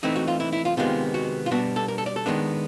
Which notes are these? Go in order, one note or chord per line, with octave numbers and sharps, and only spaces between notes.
E3 A3 C4 D#4 E4
F#4
F4
E4
E4
F4
C3 D#3 G#3 B3 F4
F#4
F4
B2 G3 B3 D4 F#4
A4
A#4
A4
D5
A4
D#3 G#3 B3 D4